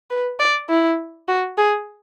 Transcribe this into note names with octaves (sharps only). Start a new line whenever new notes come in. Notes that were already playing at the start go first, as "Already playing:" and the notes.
B4
D5
E4
F#4
G#4